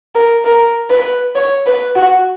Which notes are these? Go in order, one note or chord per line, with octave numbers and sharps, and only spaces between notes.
A#4
A#4
B4
C#5
B4
F#4